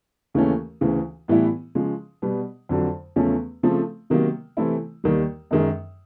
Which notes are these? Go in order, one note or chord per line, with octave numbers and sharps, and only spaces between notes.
D#2 C#3 E3 A3 C#4
D2 C#3 E3
A2 E3 G3 B3 E4
C#3 F3 G#3
B2 G3 B3
F2 D3 F#3
E2 C#3 F3 A3 C#4
C#3 F3 A3 C4
C3 D#3 F#3 A#3
C3 E3 A3 C4 E4
D#2 D#3 G3
F#2 D#3 G#3